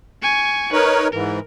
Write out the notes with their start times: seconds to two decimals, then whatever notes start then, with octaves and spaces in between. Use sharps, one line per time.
0.22 G#5 C#6
0.73 D#4 A#4 B4 C#5
1.13 G#2 E3 A#4